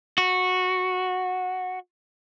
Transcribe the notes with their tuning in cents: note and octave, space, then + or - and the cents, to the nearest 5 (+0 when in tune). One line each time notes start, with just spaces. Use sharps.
F#4 -10